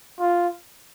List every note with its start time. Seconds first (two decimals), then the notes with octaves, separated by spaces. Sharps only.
0.20 F4